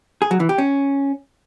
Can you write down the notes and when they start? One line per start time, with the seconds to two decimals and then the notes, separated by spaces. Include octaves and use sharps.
0.22 G#4
0.31 F#3
0.40 E3
0.49 G4
0.58 C#4